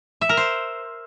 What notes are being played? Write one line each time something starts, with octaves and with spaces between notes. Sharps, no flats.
E5
A#4
C5